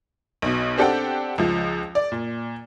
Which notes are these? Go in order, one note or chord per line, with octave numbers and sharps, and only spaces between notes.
B1 B2
C4 D4 G4 A4 F#5 G5
C#2 F3
D5
A#2